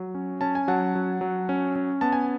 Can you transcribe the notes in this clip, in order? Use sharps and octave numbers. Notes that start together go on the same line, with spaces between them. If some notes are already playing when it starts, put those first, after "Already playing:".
Already playing: F#3
C#4
C#4 A5
G#5
F#3 F#5 A5
F#3
F#3
C#4
C#4
B3 A5
G#5